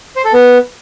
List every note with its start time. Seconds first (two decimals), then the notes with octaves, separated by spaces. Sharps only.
0.16 C5
0.25 A4
0.33 B3